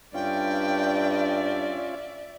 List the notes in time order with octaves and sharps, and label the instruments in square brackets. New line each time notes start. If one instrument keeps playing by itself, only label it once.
[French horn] G2 [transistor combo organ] C#4 F4 [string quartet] D5 E5 [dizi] G5